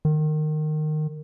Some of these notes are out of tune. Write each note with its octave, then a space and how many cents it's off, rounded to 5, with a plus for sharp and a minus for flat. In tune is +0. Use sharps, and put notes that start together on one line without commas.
D#3 -20